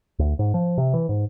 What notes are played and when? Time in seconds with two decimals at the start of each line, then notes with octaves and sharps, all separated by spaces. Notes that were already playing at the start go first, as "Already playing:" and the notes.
0.19 D2
0.39 G#2
0.54 F3
0.78 C3
0.94 E3
1.09 G#2